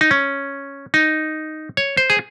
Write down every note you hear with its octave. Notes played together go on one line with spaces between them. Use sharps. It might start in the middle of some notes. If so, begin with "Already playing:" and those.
D#4
C#4
D#4
C#5
C5
G#4